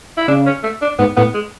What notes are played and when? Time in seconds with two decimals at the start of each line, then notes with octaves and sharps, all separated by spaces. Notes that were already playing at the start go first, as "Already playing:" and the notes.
0.17 E4
0.28 C#3 D4
0.46 C#4
0.63 A3
0.82 D4
0.99 G#2 B3
1.17 A2 B3
1.34 G#3